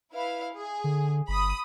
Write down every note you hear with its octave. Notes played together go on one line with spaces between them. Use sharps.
E4 B4 F5
G#4
D3
G1 B5 D#6